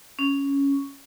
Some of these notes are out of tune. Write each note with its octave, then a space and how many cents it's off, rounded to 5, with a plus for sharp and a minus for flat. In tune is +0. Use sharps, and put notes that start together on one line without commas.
C#4 +5